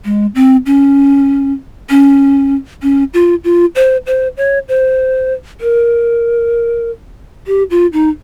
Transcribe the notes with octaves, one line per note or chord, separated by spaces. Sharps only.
G#3
C4
C#4
C#4
C#4
F4
F4
C5
C5
C#5
C5
A#4
G4
F4
D#4